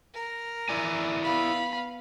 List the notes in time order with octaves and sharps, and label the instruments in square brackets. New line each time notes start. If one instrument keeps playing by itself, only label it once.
[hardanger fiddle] A#4
[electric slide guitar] E4 D5 G#5
[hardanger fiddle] B3 F5 [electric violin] B5